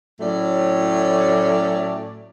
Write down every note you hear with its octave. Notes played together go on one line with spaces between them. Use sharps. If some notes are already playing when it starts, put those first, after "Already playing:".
A2 F#3 A3 C#4 D5